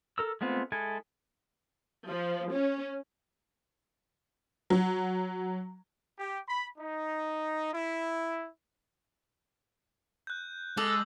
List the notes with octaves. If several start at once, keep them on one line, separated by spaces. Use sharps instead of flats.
A4 A#4 E6
G#3 A3 B3 C4 F4
G#3 E4 A4 G#5
F3
C#4
F#3
G4
B5
D#4
E4
F#6 G6
G#3 A4 D6 E6 F#7